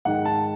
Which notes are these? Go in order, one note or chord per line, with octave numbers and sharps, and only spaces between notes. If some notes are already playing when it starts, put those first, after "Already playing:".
G#2 D#3 G#3 D#4 F#5
A5